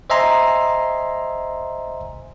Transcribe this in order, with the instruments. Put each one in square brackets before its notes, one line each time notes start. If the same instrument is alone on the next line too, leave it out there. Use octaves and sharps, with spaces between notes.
[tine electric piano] C5 D#5 E5 G#5 A#5 C6